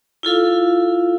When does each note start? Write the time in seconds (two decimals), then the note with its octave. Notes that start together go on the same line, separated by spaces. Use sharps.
0.23 E4 F4 A4 F5